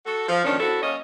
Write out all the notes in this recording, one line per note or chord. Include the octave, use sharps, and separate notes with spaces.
F#4 A4
F3
F2 A#2 D#3 C#4 D4
C4 E4 F#4 A4
F#3 A#3 C#4 C#5 D#5